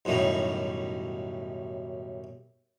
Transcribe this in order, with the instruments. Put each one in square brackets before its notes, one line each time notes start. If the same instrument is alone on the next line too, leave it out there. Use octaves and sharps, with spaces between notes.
[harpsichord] B1 F#2 A2 D#3 G3